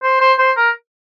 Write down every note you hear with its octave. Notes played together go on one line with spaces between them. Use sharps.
C5
C5
C5
A#4